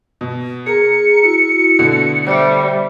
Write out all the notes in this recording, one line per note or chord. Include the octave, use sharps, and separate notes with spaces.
B2
G#4 A#4 A#5 C#7
E4 F#4
B2 D3 A3
G3 C5 D5 E5